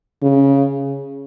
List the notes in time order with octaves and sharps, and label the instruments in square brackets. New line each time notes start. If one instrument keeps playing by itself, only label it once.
[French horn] C#3